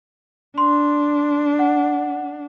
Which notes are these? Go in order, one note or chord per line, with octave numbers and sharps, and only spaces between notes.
D4 C6
F#5